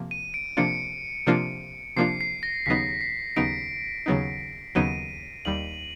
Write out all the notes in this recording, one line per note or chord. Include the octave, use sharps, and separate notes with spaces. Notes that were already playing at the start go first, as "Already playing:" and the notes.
Already playing: C3 F3 A#3
D#7
D7
C3 F3 A#3 D4 F4 C#7
C3 F3 A#3 D4 F4
C3 F3 A#3 D4 F4 C7
C7
A#6
D#2 C#3 F#3 B3 D#4 B6
C7
D#2 C#3 F#3 B3 D#4 D7
D#2 C#3 F#3 B3 D#4
D#2 C#3 F#3 B3 D#4 D#7
D#2 D#3 G3 F#7